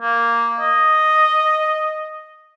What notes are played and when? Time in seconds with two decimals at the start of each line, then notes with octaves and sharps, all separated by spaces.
0.01 A#3
0.60 D#5